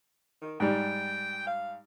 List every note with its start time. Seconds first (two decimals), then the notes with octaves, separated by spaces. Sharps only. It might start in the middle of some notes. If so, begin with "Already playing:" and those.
0.42 D#3
0.60 G#2 G3 G5
1.47 F5